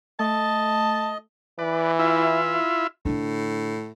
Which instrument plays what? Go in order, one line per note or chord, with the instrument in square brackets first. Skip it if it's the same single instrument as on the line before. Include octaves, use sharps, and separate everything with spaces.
[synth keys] A3 [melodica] D#5 [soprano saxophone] A5
[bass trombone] E3 [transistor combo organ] B4 D5
[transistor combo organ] E4 F4 E5
[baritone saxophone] A2 [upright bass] D3 D4